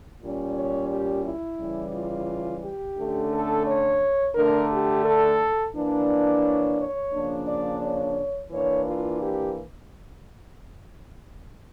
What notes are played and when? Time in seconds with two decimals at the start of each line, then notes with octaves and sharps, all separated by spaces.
0.21 A#2 G3 C#4
0.55 C#5
0.90 G4
1.24 E4
1.59 C#3 E3 G3
1.94 F4
2.62 G4
2.97 D3 A3 C#4
3.32 A4
3.67 C#5
4.35 D3 A3 D4 A#4
4.71 G4
5.05 A4
5.74 E3 A#3 D4
6.43 C#5
6.78 C#5
7.12 C#3 F3 A#3 D4
7.47 D5
7.82 C#5
8.51 E3 A#3 D4 C#5
8.85 F4
9.20 G4